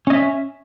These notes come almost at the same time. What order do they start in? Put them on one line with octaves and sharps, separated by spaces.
C#4 D#5 E5